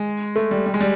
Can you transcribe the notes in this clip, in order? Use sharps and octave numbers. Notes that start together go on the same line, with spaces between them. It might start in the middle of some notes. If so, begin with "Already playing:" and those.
Already playing: G#3
A3
G3
G3
G#3
G3